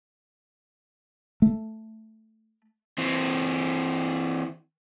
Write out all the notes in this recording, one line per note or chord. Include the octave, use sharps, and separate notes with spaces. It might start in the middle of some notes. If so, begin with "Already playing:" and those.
A3
E3 C4